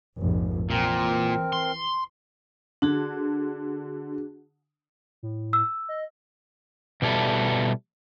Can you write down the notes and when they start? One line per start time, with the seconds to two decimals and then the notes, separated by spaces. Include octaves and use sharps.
0.20 F1 A#1 G#2
0.70 A#2 E3 C4 A#4
1.53 C6
2.82 D3 D4 F#4 G#4
5.23 A2
5.53 E6
5.88 D#5
7.02 B2 G3 E4 A4